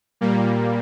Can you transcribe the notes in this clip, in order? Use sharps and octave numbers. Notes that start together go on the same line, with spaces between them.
A#2 G3 A#3